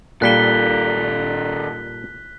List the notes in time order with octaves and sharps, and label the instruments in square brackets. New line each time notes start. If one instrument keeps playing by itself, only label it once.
[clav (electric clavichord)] A#2 G3 A#3 [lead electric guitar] D#3 A4 [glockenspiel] F#6 B6 G7